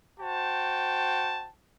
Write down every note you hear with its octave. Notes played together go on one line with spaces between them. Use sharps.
F#4 C5 G5 A5